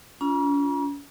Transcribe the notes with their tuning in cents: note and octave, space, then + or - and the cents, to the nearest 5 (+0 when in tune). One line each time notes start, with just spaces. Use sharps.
C#4 +40 F4 +0 A#5 +45